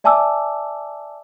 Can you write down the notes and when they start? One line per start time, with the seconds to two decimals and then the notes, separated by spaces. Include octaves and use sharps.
0.04 D5 E5 G#5 A5 D6 E6